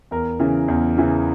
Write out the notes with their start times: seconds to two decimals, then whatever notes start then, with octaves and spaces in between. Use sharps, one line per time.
0.11 E2 A#4
0.40 C#3 E3
0.68 E2
0.98 C#3 E3